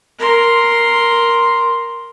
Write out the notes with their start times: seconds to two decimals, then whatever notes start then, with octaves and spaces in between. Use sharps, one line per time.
0.19 A#4 C6